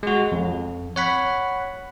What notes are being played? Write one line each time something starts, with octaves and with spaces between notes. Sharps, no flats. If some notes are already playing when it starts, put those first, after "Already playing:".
G#3 F#4
F2
C#5 F#5 B5